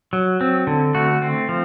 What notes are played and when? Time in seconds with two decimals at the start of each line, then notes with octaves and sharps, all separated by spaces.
0.13 F#3
0.41 C4
0.67 D3
0.95 A3 F#4
1.22 C4
1.49 F3